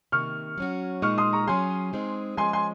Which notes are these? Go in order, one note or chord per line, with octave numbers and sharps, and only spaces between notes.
C3 D#3 A#3 C#6 F6
F#3 C#4 F#4
A#2 G#3 D#4 C#6 F6
C6 D#6
A#5 C#6
F#3 C#4 G#4 G#5 C6
G#3 C4 D#4 G#4
F3 G#3 C#4 G#5 C6
G#5 C6